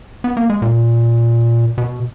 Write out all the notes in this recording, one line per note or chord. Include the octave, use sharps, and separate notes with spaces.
B3
A#3
G#3
A#2
B2